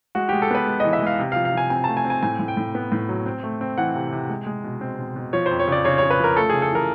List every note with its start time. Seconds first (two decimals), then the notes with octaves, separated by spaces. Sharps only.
0.15 G#3 F#4
0.29 G#3 G4
0.42 A4
0.51 B3 B4
0.67 G#3
0.80 E3 D#5
0.93 E5
1.01 G#3 F5
1.19 C3
1.32 F3 F5
1.45 F5
1.53 F3 G#5
1.70 C4 G#5
1.84 A3 A5
1.97 G#5
2.05 C4
2.10 G#5
2.22 A2 G#5
2.39 A2
2.48 G5
2.57 A2
2.75 B3
2.92 A2
3.09 F#3
3.26 C4
3.43 A3
3.61 C4
3.78 E3 F#5
3.95 C3
4.12 C3
4.29 G#3
4.47 G#3
4.64 B2
4.81 C4
4.98 B2
5.16 B2
5.33 F3 C#5
5.46 F2 C5
5.59 C#5
5.68 C#3 D5
5.85 C#3 C#5
5.98 C#3 C#5
6.10 B4
6.19 F3 A#4
6.37 A3 A4
6.50 C#3 G#4
6.62 A4
6.71 E3 A#4